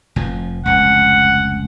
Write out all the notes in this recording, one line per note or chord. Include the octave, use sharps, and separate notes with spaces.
F1 F3
F1 C#2 F#5